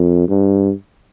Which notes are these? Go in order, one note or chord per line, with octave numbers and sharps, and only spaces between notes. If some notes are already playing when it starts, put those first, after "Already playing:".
Already playing: F2
G2